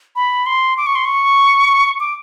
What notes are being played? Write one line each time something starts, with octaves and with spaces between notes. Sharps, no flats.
B5
C6
D6
C#6
C6
C#6
D6